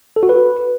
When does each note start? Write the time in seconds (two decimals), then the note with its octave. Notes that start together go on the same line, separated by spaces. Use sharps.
0.16 A4
0.23 F#4
0.29 B4